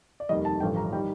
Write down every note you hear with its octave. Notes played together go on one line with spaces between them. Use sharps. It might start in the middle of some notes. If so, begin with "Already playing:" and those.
D5
F1 D#2 D#3 G3 D#5
A5
A1 G2 D3 F3 G5
A#5
D#3 G3 G5